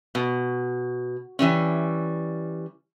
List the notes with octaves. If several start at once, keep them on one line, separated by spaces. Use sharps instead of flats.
B2
E3 G3 C#4